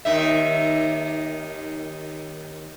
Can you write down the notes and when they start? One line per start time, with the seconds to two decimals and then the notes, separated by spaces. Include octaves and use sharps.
0.05 D#2 D#3 E5